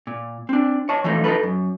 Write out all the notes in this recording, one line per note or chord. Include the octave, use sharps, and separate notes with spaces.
A#2
C4 D4
C#5 D#5 A5
E3 F3 A3 D#4
D#4 E4 A4 B4
F#2